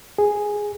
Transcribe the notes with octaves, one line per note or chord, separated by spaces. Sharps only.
G#4